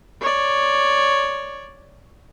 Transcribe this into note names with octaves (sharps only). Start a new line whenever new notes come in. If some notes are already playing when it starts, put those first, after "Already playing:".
C#5 D5